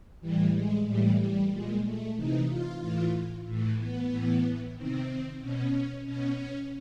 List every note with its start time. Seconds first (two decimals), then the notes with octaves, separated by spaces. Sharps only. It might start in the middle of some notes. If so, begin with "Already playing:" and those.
0.21 A2 E3 G3
0.54 G#3
0.86 A2 E3 G3
1.20 G3
1.51 A#2 G#3
1.84 A3
2.16 C3 E3 D#4
2.49 F4
2.81 A2 E3 F4
3.47 A2 E3
3.79 B3
4.11 A2 E3
4.76 C3 D#3 C4
5.41 B2 C#4
6.06 B2 C#4